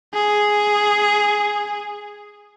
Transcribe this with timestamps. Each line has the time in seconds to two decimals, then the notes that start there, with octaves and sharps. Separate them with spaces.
0.14 G#4